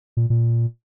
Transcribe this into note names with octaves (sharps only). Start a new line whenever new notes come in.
A#2
A#2